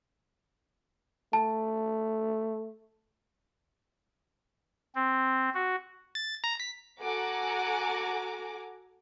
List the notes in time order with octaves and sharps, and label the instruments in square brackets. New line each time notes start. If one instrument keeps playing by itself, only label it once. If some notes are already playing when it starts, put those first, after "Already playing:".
[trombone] A3 [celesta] A5
[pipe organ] C4
F#4
[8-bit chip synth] A6
A#5
B6
[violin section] F#4 A4 F#5 G#5 A#5 D6